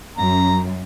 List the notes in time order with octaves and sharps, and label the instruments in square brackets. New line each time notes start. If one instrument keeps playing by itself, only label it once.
[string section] F#2 [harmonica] A#5